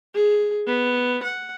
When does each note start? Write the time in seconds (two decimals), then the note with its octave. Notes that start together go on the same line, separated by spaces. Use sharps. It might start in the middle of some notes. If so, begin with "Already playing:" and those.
0.15 G#4
0.67 B3
1.23 F#5